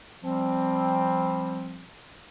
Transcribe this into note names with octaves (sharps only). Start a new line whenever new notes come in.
F3 G3 C4